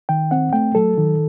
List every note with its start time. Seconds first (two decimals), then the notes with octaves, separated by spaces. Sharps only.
0.09 D#3 G5
0.31 C4 F#5
0.53 A3 G5
0.75 F#3 A4
0.98 D#3